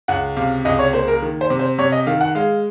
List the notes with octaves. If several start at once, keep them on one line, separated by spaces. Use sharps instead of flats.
C#2 F#5
C3 F5
C#2 D#5
C#5
A#3 C5
A#4
D#3
C5
C3
C5
C3 C#5
D#5
D#3 F5
F#5
G#3 F5